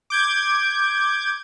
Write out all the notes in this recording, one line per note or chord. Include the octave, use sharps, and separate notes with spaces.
D6 G6 G#6